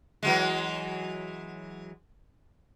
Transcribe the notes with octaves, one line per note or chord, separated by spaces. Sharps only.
E3 F#3 G#3